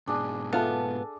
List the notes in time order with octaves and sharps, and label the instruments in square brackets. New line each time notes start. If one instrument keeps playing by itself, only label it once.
[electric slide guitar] G#2 B2 [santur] D4 G#4
[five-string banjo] B3 F4 [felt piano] A4 E5 A5